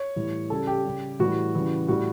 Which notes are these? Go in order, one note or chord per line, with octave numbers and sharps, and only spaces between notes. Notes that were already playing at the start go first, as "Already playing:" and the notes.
Already playing: C#5
A2 E3 G3
C#3 G3 A4
G4
C#3 G3
A2 E3 G3 F#4
C#3 E3 G3
A2 G3 F#4